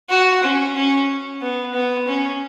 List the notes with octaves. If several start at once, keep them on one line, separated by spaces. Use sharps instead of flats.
F#4
C#4
C#4
B3
B3
C#4